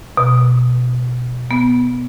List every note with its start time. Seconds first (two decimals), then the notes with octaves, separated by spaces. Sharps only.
0.17 B2
1.51 B3